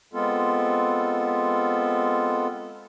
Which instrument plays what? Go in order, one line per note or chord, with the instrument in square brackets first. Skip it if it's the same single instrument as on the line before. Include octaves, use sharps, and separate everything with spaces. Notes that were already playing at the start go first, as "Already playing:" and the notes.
[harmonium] G#3 B3 C4 F4 A4